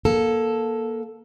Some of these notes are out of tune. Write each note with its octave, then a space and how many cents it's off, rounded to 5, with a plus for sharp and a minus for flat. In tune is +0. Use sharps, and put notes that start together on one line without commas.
A#3 +20 A4 +0